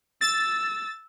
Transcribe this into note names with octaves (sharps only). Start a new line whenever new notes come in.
E6 A6